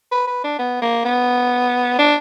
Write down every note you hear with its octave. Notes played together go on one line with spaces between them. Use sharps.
B4
B4
D4
B3
A#3
B3
D4